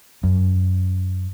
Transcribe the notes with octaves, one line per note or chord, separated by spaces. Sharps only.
F#2